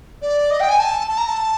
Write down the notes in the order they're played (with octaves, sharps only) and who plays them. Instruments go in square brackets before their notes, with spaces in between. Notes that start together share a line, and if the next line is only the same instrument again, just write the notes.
[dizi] D5
D#5
G5
G#5
A5
A5
A#5
A5